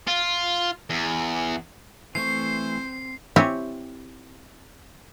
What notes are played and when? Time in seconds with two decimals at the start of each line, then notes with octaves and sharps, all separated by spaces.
0.08 F4
0.90 E2
2.15 E3 A3 C4 C5 C#6 C7
3.36 C4 E4 G4 C#5 G#5